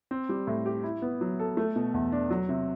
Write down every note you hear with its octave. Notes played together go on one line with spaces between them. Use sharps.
C4
G3
A2
G4
E4
B3
F#3
A4
A3
B2
E2
D4
F#3
C3